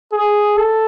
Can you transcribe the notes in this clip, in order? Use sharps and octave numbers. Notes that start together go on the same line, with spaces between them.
G#4
A4